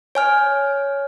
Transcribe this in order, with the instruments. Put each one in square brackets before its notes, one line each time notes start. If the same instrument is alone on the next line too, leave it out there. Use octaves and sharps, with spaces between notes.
[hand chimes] C#5 G#5 F6